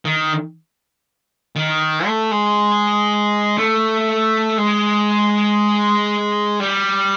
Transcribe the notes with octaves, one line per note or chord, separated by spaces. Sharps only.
D#3
D#3
A3
G#3
A3
G#3
G3